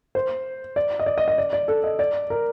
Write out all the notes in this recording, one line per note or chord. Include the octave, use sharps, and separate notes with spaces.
C5
D5
D#5
D5
D#5
D#5
D5
D5
A4
D#5
D5
A#4